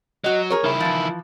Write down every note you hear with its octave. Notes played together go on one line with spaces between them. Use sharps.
F#3 F#4 D#5
G#4 A#4 C#5
D#3 E4
E3 F3